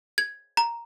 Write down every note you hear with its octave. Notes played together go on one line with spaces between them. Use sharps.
G#6
A#5